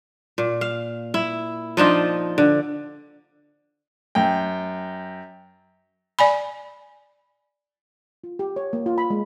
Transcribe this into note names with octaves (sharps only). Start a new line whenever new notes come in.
A#2
F5
E4
F3 D4 D#4 F4
D3
F#2 G5
D5 G#5 B5
F4
G4
C#5
A#3
F4
B5
G#3